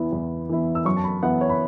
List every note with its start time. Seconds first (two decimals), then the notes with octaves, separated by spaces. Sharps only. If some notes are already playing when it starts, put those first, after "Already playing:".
Already playing: E2 E3 B3 E4
0.12 E2
0.49 E3 B3 E4
0.75 E6
0.85 F#2 C#6
0.97 A5
1.04 B5
1.23 E3 B3 E4 F#5
1.41 C#5
1.49 B5